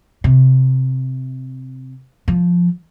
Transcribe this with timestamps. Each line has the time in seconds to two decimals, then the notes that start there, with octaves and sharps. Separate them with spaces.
0.24 C3
2.28 F3